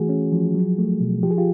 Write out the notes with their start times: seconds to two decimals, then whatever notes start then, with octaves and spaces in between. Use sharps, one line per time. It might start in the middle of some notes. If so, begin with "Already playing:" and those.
Already playing: E3 A3 F#4 G#4
0.09 C#4
0.32 F3
0.55 F#3
0.78 A3
1.01 B2
1.23 F3 G4
1.31 G#4
1.38 F4 G4